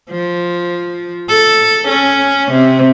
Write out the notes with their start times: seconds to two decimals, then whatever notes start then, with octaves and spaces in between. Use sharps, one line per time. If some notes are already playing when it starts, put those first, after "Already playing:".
0.10 F3
1.29 A4
1.88 C#4
2.52 C3